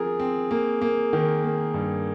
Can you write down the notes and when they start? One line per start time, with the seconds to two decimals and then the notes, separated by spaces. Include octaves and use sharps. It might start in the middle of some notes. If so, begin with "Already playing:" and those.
Already playing: F3 C4 G#4 A#4
0.20 C4
0.51 A#3
0.81 A#3
1.13 D#3
1.44 A#3
1.74 G2